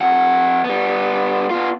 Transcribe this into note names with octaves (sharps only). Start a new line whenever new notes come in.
F2 F#5
G3 B3
B3 F4